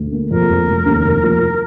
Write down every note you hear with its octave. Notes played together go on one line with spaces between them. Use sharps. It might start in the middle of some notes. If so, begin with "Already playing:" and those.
Already playing: D2
A#3
F2 A#4
F1
F1
D#2
F1
F3